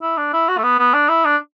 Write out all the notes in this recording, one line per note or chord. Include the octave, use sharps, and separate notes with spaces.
E4
D4
E4
F#4
A3
B3
B3
D4
E4
D4